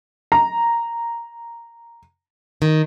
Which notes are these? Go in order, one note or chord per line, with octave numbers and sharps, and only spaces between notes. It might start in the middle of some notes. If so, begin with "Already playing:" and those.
A#5
D#3